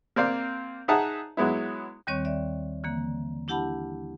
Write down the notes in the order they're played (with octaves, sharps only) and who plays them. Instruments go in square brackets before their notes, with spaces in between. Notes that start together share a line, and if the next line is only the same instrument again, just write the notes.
[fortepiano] A#3 C4 D5 F5
D#4 G#4 E5 F#5 A5 A#5
F#3 G#3 B3 E4
[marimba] D#2 D#3 G3 C4 C#5 C#6
D5 E5
D3 E3 A#3
D4 E4 G4 F#5 A5 B5